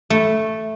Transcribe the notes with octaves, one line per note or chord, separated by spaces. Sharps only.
A3